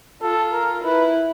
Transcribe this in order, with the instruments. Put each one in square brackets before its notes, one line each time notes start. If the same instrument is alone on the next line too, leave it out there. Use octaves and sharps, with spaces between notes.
[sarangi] F4 [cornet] A4
[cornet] A#4
[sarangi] E4 [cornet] B4